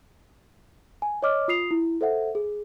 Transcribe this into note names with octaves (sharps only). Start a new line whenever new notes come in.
G#5
C#5 D#5 D6 F6
F4 D#6 C7 F7
E4
A4 C5 E5 F#5
G#4